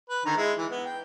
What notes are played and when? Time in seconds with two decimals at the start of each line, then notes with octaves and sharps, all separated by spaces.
0.10 B4
0.26 D3 D#3 A#5
0.37 G#3 E4
0.58 E3
0.71 B3
0.85 G5